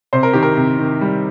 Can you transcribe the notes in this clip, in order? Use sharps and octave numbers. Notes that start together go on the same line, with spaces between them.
C3 C5
A#4
D#3 G4
A#4
C3
D#3
G3